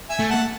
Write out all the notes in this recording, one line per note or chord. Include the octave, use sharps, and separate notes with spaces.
E5 G#5
A3
F#5 A5